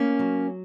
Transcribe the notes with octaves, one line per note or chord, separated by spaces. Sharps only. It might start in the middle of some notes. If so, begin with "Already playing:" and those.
Already playing: A#3 C#4
F#3